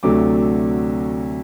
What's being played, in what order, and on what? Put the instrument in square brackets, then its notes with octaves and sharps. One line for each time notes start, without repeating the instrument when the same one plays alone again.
[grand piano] D2 C3 F#3 A3 D4 D6